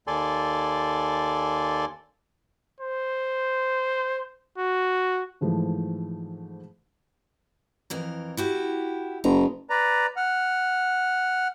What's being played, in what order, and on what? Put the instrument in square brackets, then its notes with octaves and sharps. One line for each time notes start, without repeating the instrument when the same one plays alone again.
[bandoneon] D#2 A4 D5 G#5 C6
[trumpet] C5
F#4
[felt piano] G#2 E3 F3 A3
[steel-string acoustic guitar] F2 E3 A#4
E4 F#4 G4
[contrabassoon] F#1 [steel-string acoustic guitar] A#5
[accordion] B4 D5 A#5
F#5 F6